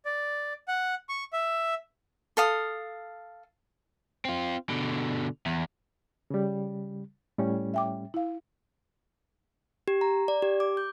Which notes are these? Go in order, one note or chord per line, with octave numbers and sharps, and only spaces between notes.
D5
F#5
C#6
E5
A4 F5 D#6
C4 F4
B2 D3
E2
C#3 G3
A2 G3 C#4
E5 G5 D6
E4 F5
G4
A#5
D5
G4
D6
G6